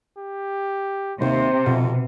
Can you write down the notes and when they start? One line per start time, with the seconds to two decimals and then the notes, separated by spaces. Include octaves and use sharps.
0.17 G4
1.21 D#2 C3 C5
1.66 F2 B2